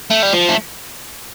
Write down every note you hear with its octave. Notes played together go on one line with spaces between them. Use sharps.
A3
G3
F3
A3